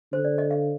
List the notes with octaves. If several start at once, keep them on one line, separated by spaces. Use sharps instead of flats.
D3 C5
D5
D#5
F5